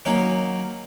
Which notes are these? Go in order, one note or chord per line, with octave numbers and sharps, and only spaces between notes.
D#3 F#3 A#3 C#4